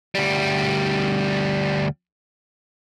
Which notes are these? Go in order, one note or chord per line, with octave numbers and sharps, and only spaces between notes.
D2 G3